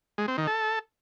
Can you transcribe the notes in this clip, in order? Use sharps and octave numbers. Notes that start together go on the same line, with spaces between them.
G#3
C4
D#3
A4